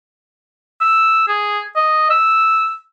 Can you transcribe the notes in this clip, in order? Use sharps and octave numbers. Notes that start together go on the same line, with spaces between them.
E6
G#4
D#5
E6